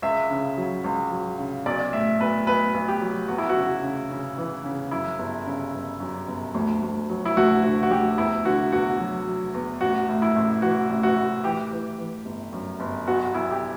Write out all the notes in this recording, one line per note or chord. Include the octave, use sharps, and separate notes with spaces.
C#2 E5
C#3
F#3
C#2
F#3
C#3
B1 D5
A2 E5
B1 B4
B1 B4
B1
G4
F#3
E2 F#4
E4
F#4
C#3
C#3
C#3
E3
C#3
F#2 E4
G1
C#3
G1
F#2
G1
D2
D2
F#3
E4
D2 F#4
D3 F#4
F#4
D2 G4
E2 E4
D3 F#4
E2 F#4
F#3
F#3
E2
A1 F#4
A2
E4
A1
E3 F#4
A1
F#4
A2
E3 G4
E3
E3
G1
F#2
G1
B1 F#4
B1 E4
G4